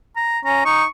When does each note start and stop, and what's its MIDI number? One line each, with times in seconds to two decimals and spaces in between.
0.16 0.39 82
0.45 0.63 61
0.45 0.63 82
0.65 0.83 63
0.65 0.87 85